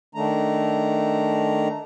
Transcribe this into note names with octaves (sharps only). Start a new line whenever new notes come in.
D#3 A3 D4 A#5